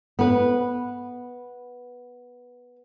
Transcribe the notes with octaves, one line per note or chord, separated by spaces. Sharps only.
B3 B4